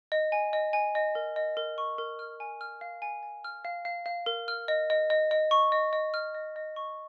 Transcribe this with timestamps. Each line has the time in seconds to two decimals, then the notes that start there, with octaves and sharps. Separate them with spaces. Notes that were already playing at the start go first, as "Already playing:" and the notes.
0.12 D#5
0.32 G#5
0.53 D#5
0.73 G#5
0.95 D#5
1.15 A#4
1.36 D#5
1.57 A#4
1.78 C#6
1.98 A#4
2.19 F6
2.40 G#5
2.61 F6
2.81 F5
3.02 G#5
3.23 G#5
3.44 F6
3.65 F5
3.85 F5
4.06 F5
4.26 A#4
4.48 F6
4.68 D#5
4.90 D#5
5.10 D#5
5.31 D#5
5.51 C#6
5.72 D#5
5.93 D#5
6.14 F6
6.35 D#5
6.56 D#5
6.76 C#6